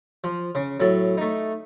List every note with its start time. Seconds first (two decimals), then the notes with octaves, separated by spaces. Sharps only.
0.24 F3
0.55 C#3
0.80 A2 F#3 A4
1.17 A3 D#4